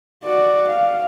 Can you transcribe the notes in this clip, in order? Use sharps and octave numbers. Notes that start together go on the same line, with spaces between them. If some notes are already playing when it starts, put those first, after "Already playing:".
F#4 D5
F5